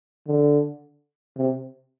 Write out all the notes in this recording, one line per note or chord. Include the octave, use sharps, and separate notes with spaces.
D3
C3